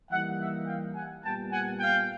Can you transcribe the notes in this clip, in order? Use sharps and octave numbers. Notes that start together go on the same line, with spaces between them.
E3 G3 A#3 D#4 E5 F#5
E5 F#5
F5 G5
F#5 G#5
A#2 G3 B3 G5 A5
F#5 G#5
F5 G5